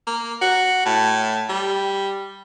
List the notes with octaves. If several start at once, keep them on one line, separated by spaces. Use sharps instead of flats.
A#3
F#4
A2
G3